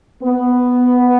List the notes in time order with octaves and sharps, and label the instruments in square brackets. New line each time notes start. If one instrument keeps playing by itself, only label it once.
[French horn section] B3